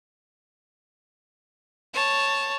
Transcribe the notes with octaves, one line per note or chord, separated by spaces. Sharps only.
C#5 A5